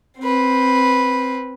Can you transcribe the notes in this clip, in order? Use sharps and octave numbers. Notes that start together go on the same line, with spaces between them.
C4 B4